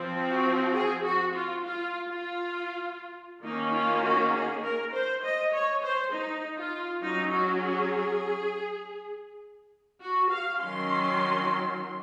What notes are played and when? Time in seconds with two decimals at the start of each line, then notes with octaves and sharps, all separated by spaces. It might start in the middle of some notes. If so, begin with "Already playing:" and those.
Already playing: F3 C4
0.30 F#4
0.74 G#4
1.04 F#4
1.34 F4
1.64 F4
2.08 F4
3.43 D#3 A#3 C#4 D#4
3.73 F4
4.03 F#4
4.33 G#4
4.63 A#4
4.93 C5
5.23 D#5
5.53 C#5
5.83 C5
6.13 D#4
6.57 F4
7.02 F#3 C#4 D#4
7.33 F#4
7.62 G#4
10.01 F#4
10.31 F5
10.60 D#3 F#3 C#4 C6